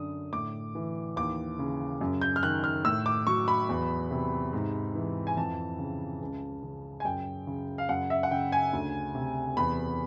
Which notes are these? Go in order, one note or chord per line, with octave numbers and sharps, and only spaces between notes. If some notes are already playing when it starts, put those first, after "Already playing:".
Already playing: F#2 D3 D#6
A2 D6
E3
D#2 D6
C#3
F#2
G6
F6
D#3 F#6
F6
A2 E6
D6
F#3 C#6
B5
E2
C3
G#2
E3
G#5
F2 A5
C#3
C#2
C#3
G#5
F#2 G5
C#3
F5
F#2 F#5
E5
F#5
C#3 G5
G#5
D2
C3
E2 B5